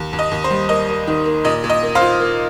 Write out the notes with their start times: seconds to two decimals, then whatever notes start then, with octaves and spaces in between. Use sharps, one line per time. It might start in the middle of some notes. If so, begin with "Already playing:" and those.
Already playing: D#2
0.13 D#2
0.19 D#5
0.31 D#2
0.44 C5
0.50 G3
0.69 A#3 D#5
0.88 A#3
1.07 D#3
1.25 A#3
1.44 A#2 D#5
1.64 A#2
1.69 D#5
1.83 A#3
1.95 C5 F5
2.01 F4
2.20 A#3